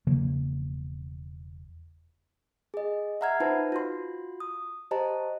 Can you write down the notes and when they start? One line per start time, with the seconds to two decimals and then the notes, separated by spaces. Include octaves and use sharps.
0.07 E1 C#3 F3 A#3
2.74 G#4 D#5
3.21 E5 F#5 A#5 F6 G#6
3.40 D#4 F4 B4 C5 A5
3.72 F4 F#4 C6
4.40 D#6
4.91 G4 C5 D#5 A5 A#5